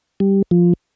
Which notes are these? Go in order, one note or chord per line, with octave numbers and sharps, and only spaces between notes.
G3
F3